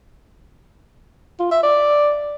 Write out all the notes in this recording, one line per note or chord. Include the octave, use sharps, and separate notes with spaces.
F4
E5
D5